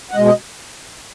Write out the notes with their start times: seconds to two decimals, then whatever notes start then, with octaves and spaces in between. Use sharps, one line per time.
0.11 F#5
0.15 B2 G#3 D#5
0.26 D#5